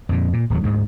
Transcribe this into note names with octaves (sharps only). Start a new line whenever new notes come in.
F2 A#2
A#2
D1 E2 F#3
D2 G#2